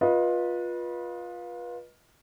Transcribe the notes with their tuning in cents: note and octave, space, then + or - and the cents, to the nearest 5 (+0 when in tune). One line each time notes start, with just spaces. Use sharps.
F4 +15 B4 -25 D#5 +0